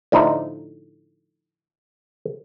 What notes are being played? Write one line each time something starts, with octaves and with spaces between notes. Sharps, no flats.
A2 D3 F3 A3 D#4